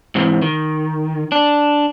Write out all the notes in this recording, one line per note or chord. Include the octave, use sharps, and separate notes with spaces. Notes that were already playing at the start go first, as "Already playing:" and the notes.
G#2 C3 E3
D#3
D4